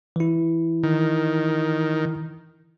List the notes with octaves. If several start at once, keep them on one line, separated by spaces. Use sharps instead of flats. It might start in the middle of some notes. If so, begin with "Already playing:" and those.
E3 E4
D#3